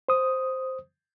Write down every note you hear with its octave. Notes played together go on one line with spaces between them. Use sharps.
C5 D#6